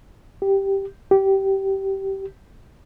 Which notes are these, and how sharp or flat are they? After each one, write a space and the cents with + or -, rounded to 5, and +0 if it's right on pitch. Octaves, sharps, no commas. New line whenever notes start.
G4 +0
G4 -15